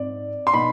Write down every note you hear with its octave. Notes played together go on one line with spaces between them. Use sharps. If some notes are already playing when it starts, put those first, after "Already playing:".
Already playing: G#2 C4 D5
C6
B2 B3 D#4 B5